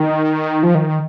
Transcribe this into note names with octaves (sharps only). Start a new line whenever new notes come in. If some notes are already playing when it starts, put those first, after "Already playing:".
Already playing: D#3
F3
D#3